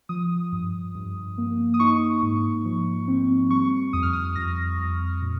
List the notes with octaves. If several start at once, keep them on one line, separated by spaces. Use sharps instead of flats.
F3 D#6
G2
G2
A#3
D#6
D#4 C#6
G#2
F3
C4
G3 C#6
F2 D#6
F6
D#6
F2 A#6
F2
A#2